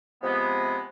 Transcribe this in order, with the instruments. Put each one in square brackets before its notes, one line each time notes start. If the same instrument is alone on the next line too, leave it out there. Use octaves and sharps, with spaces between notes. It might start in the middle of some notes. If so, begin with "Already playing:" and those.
[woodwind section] C3 F3 G#3 B3